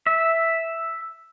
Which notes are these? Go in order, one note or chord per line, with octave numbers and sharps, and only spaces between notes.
E5